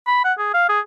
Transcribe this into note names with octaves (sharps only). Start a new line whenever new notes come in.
B5
F#5
G#4
F5
G#4